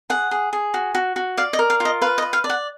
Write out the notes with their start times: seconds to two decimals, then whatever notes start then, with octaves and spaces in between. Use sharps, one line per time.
0.10 G#4 F#5
0.31 G#4
0.53 G#4
0.74 F#4
0.94 F#4
1.16 F#4
1.37 D5 F5
1.53 D#5
1.59 A#4
1.70 F5
1.80 F4
1.85 D#5
2.01 B4 F5
2.18 D#5
2.22 B4
2.33 F5
2.44 D5
2.49 F#5